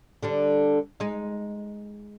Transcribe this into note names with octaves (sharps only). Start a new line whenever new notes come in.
D3 G3 D4
G#3 D#4